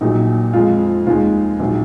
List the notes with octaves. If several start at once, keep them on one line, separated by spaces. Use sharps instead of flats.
A#1 A#2 F#3 D#4
F2 F3 G#3 F4
D#2 D#3 G#3 F4
A#1 D#3 F#3